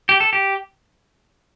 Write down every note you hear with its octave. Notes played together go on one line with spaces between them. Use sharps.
G4
A4
G4